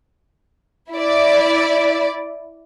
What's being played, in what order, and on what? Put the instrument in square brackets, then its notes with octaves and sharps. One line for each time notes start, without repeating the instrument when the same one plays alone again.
[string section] E4 D5